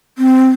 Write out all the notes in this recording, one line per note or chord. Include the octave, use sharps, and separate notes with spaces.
C4